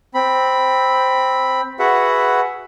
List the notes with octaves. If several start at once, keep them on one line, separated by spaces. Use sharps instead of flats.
C4 B5
F#4 G#4 B4 E5 F#5